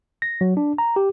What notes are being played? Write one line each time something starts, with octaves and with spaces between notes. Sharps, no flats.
A#6
F#3
D4
A#5
G4